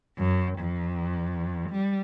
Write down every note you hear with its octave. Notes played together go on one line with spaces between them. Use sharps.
F#2
F2
G3